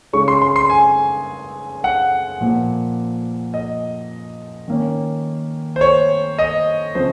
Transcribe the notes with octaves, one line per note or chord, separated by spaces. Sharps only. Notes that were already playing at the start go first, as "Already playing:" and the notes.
C#3 G#3 C#4 C#6
C6
C6
C6
G#5
F#5
A#2 F3 A#3
D#5
D#3 A#3 C#4
C5
C#5
D#5
C#3 F3 C4 C5